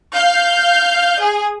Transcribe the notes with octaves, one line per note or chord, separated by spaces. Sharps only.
F5 G6
G#4